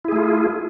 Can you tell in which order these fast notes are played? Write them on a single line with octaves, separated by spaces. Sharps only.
E4 G#4 A3 F4